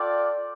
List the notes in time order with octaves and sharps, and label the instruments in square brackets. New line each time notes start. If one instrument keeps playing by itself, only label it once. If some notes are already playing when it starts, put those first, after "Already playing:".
Already playing: [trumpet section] F4 A4 D5 G5